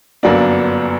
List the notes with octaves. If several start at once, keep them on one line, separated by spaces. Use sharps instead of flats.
G1 F#2 F#3 A#3 D4